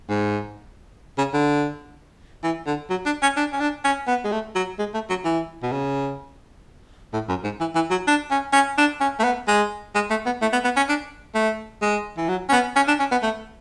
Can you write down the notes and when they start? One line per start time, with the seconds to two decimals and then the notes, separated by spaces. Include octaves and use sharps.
0.09 G#2
1.18 C#3
1.33 D3
2.43 E3
2.67 D3
2.90 F#3
3.06 D4
3.22 C#4
3.37 D4
3.53 C#4
3.60 D4
3.84 C#4
4.07 B3
4.24 G#3
4.32 A3
4.55 F#3
4.79 G#3
4.94 A3
5.09 F#3
5.25 E3
5.62 B2
5.72 C#3
7.13 A2
7.29 F#2
7.44 G#2
7.60 E3
7.75 E3
7.90 F#3
8.07 D4
8.31 C#4
8.53 C#4
8.78 D4
9.00 C#4
9.19 A3
9.24 B3
9.48 G#3
9.95 G#3
10.10 A3
10.26 B3
10.42 A3
10.53 B3
10.64 B3
10.76 C#4
10.89 D4
11.35 A3
11.82 G#3
12.18 E3
12.28 F#3
12.49 C#4
12.52 B3
12.76 C#4
12.88 D4
12.99 C#4
13.12 B3
13.23 A3